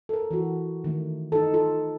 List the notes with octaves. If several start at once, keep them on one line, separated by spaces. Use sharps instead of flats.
A4 A#4
E3 F#4
D#3 A3
D#4 A4
F4 A4